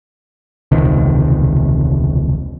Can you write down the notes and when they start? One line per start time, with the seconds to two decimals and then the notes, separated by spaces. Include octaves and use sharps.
0.72 E1 C#2 C3 D#3